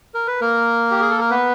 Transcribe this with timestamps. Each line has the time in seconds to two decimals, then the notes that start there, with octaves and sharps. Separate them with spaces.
0.14 A#4
0.27 B4
0.41 A#3 A#4
0.91 G4
1.01 G#4
1.10 A4
1.21 A#4
1.31 B3 B4